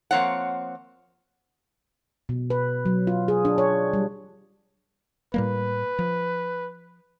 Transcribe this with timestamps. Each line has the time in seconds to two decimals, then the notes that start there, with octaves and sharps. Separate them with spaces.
0.11 F3 A#3 C4 C#5 F#5
2.29 B2
2.50 B4
2.85 F#3
3.07 F4
3.28 G#4
3.45 D4
3.58 C#5
3.93 G3
5.34 A2 G3 A#3 B4
5.99 F3